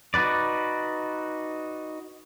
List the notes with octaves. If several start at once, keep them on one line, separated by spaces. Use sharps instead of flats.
D#4 F#4 B4 D5